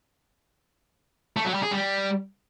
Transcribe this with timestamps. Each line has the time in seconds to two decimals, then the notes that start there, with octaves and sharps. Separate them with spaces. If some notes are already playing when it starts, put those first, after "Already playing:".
1.37 A3
1.45 F#3
1.54 G3
1.63 G#4
1.72 G3